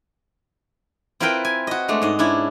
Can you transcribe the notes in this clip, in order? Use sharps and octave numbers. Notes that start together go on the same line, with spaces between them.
C4 E4 F4 A#4 B4 G5
G#5
F#4 D#5
G#3 A3 D4
G#2 D#5
C#4 D4 E4